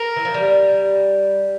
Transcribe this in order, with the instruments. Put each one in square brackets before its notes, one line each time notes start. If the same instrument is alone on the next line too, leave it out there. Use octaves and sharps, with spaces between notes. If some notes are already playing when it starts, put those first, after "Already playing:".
Already playing: [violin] A#4
[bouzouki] E3
F3
G3